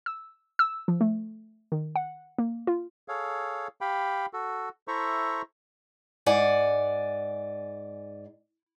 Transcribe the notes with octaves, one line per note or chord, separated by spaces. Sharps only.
E6
E6
F3
A3
D#3
F#5
A#3
F4
G#4 A4 C#5 F5
G4 F5 G5 B5
F#4 A4
E4 A4 C5 E5 A#5 C#6
G#2 D5 F#5 G#5